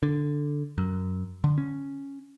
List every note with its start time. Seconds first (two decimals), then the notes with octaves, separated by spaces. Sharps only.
0.03 D3
0.78 F#2
1.44 D3
1.58 C#4